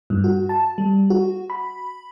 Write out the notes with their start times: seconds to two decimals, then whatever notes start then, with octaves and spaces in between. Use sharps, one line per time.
0.10 G2
0.24 F#4
0.49 A5
0.78 G3
1.10 F#4
1.50 B5